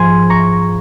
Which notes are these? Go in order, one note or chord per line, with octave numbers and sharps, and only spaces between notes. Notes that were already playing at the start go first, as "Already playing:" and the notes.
Already playing: G#2 F3 G#5 C6
A#5 C#6